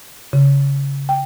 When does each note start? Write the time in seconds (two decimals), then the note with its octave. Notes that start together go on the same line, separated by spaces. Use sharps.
0.33 C#3
1.09 G5